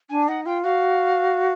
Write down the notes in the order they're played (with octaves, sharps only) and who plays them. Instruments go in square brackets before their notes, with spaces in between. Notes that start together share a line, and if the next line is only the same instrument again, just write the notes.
[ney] D4 [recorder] G#5
[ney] D#4 [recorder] F#5
[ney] F4 [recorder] G5
[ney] F#4 [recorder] F5